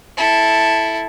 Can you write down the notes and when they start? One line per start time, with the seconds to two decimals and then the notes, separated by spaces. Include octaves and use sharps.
0.17 E4 A4